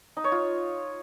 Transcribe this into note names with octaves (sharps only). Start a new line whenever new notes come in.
D#4
C#5
F4